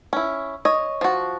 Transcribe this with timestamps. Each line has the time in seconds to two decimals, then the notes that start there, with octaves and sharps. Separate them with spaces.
0.13 C#4 E4
0.65 C#5 D#5
1.01 F3 F#4